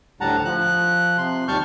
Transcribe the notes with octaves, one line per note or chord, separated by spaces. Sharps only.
D2 A2 G3 F#5 A5 A#5
F3 F#6
C3 C6
D#2 G3 A5 C#6 F6 G6